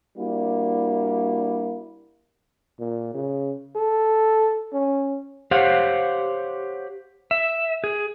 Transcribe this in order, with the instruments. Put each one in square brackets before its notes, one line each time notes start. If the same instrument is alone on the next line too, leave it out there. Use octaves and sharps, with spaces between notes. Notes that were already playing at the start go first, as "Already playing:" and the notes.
[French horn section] G3 A#3 D4 E4 F#4
[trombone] A#2
C#3
A4
C#4
[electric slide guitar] G4 C5 C#5 F5 F#5
E5
G#4